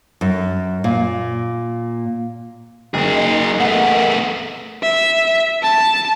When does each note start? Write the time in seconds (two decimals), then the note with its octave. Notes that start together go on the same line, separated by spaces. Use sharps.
0.21 F#2
0.84 A#2
2.94 F#1 F#3 A#3 D#4 G#4 D#5
3.60 A3 B3 G#4 A#4 D#5 F#5
4.83 E5
5.63 A5